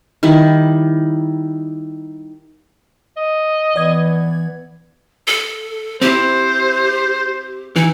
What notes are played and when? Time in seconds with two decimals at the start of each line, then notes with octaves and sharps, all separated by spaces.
0.23 D#3 G3 E4
3.17 D#5
3.76 E3 B3 D5 G#6
5.27 A4
6.01 C4 E4 G4 C5
7.76 E3 D#4